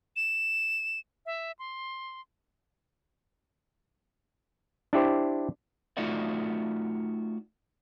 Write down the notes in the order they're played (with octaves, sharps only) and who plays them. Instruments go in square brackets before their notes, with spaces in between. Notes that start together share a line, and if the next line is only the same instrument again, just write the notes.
[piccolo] E7
E5
C6
[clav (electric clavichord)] D4 E4 G4 C5
[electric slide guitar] A3 D#4 F4 F#4 D5 E5